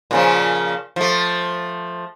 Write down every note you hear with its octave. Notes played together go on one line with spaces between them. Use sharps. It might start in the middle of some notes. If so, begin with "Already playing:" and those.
A#2 C#3 F3
F3 A3